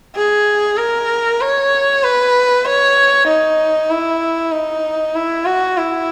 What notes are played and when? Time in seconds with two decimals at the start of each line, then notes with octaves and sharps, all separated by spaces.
0.16 G#4
0.78 A#4
1.41 C#5
2.03 B4
2.66 C#5
3.28 D#4
3.90 E4
4.52 D#4
5.15 E4
5.46 F#4
5.77 E4